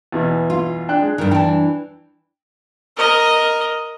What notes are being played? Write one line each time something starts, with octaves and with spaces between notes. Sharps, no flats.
E2 B2 E3
F4
D4 G5 F#6
G#3
G2 D#3
E3 D4 G5 A5
A#4 D#5